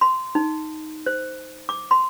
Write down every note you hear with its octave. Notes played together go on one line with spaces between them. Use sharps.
C6
D#4
C5
D6
C6